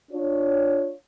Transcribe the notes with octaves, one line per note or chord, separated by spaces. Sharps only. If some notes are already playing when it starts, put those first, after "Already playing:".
D4 F4 C#5